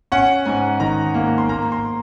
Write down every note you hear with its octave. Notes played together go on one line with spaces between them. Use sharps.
C#4 F#5
G#2 G#5
D#3 A#5
A#3
C6
A#3 A#5
C6